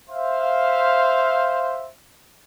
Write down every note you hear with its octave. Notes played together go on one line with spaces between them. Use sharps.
C5 E5 F5